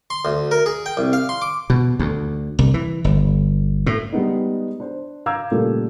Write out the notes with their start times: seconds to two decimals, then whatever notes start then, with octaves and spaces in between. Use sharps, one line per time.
0.10 C6
0.25 D2
0.51 A#4
0.66 G#4
0.86 G5
0.97 C2
1.13 F5
1.29 C6
1.42 D6
1.70 B2
1.99 D2
2.59 C2
2.74 E3
3.04 G1
3.87 A2
4.13 G3 G#3 B3 D#4
4.80 D4 C5
5.26 F5 A#5 D6 E6 G6 G#6
5.51 A#2 C#3 G3 A3 F4